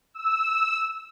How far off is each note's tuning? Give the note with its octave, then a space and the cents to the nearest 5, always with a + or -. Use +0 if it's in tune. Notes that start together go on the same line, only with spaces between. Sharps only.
E6 -10